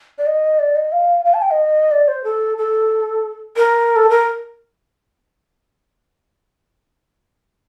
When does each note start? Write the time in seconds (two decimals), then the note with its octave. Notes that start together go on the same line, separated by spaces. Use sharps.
0.18 D5
0.27 D#5
0.59 D5
0.76 D#5
0.92 F5
1.25 F5
1.34 A5
1.42 G5
1.51 D#5
1.91 D5
2.08 C5
2.24 A4
2.58 A4
3.56 A#4
3.96 A4
4.10 A#4